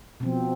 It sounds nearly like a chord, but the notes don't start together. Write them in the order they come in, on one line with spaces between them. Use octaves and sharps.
B2 C4 F3